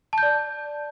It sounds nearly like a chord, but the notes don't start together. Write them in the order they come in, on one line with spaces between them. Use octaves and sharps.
A5 G6 D5